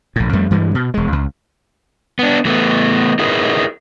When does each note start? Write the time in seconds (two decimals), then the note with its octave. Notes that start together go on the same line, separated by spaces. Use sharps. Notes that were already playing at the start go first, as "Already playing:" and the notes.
0.16 A#1 A2
0.33 F2 G3 A3
0.50 G2 E3 G3 G#3
0.75 B2
0.94 E1 G#3
1.12 C#2
2.19 B3 D4
2.45 E3 A3 B3
3.19 D#4 E4 G#4 A#4 B4